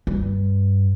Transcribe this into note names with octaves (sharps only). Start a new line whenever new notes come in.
G2